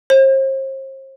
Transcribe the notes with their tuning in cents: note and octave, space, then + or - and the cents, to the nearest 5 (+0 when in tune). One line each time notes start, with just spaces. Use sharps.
C5 +40